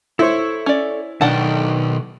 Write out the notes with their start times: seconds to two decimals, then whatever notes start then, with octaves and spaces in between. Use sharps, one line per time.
0.19 E4 A4 C5 C#5 C#6
0.66 C#4 D5
1.21 B1 D#3 D4 F#5 G5 A5